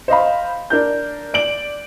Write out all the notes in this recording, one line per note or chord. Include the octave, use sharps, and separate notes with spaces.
C5 D#5 F5 B5
D4 A#4 G6
D5 D7 F#7